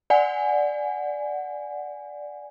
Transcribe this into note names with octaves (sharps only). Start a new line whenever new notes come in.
D5 F#5 G#5